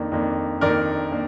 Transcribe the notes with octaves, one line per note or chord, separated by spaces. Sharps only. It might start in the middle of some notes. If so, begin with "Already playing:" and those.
Already playing: F2 D#3 A#3 D4
F2 D#3 A#3 D4
F2 D#3 A#3 D4 A#4 D5
A#3 D4